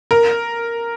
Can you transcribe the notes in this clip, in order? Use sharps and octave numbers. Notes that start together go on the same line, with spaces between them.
A#4